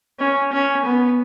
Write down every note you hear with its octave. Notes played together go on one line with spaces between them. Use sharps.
C#4
C#4
B3